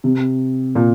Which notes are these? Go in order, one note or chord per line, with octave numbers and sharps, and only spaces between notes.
C3
A#2